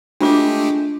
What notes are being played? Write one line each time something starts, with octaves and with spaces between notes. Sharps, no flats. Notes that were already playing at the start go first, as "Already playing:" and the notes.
G#3 A3 D4 F4 G4 D6